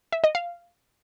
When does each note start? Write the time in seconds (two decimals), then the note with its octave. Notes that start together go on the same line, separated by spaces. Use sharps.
0.12 E5
0.24 D#5
0.35 F5